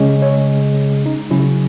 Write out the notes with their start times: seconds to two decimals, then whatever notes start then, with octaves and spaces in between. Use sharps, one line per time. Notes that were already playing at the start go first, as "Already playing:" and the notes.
Already playing: C#3 G#3 C#4
0.22 C#5
1.06 D#4
1.30 C#3 F#3 C#4 E4